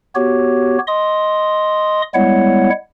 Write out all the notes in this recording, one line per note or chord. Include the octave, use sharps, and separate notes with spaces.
B3 F#4 G4 C#5
D#5 C6 D#6
G3 G#3 B3 E4 C#5 F#5